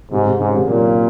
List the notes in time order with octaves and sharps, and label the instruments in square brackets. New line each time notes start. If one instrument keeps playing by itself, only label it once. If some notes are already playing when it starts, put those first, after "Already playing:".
[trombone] G#2 [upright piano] C3
[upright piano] C3
[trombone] G#2 [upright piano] C#3
[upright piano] C3 D#3
[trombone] A#2 [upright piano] F#3 A#3